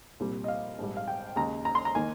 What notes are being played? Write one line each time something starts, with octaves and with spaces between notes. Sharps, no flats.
C2 A#2 G3
D#5
F5
A#1 G#2 G3
F5
G5
D#2 C#3 G#3 A#5
A#5
C6
A#5
D#3 A#3 D#4 G#5